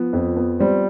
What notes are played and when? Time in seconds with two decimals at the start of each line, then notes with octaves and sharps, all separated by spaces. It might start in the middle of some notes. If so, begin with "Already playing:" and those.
Already playing: F3 B3
0.13 F2
0.36 B3
0.60 G3 C4